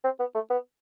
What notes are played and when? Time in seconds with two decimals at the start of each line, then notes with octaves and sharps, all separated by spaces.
0.04 C4
0.19 B3
0.35 A3
0.50 B3